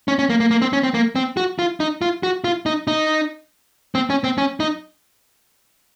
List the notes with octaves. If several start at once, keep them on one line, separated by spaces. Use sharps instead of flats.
C#4
C#4
A#3
A#3
A#3
C4
C#4
C4
A#3
C4
F#4
F4
D#4
F4
F#4
F4
D#4
D#4
C4
C#4
C4
C#4
D#4